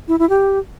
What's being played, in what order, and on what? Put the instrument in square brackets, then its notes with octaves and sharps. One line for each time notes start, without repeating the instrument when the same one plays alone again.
[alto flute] E4
E4
G4